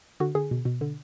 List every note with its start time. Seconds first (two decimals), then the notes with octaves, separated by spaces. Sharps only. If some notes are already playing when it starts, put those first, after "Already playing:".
0.20 D3 F#4
0.35 D3 G#4
0.51 B2
0.65 B2
0.81 D3